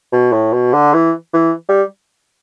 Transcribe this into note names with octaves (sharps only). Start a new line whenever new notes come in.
B2
A2
B2
D3
E3
E3
G3